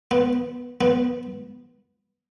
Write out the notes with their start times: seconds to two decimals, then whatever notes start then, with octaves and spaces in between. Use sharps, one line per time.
0.11 B3
0.81 B3